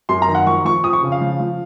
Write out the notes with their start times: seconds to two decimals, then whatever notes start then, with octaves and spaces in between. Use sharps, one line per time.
0.09 F#2 C6
0.22 A#5
0.28 D#3
0.35 F#5
0.46 F3 C#6
0.65 F3 C#6
0.84 F2 D#6
0.93 C#6
1.03 C#3
1.12 F5
1.21 F3
1.40 F3